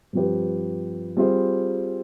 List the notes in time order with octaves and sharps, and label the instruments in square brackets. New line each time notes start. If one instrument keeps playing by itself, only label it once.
[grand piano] G2 F3 C4 G4 B4
G3 C4 F4 G#4 C5